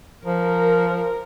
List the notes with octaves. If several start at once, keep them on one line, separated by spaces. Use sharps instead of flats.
F3 A#4